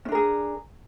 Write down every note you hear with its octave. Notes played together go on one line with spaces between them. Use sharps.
C#4 D4 G#4 A#4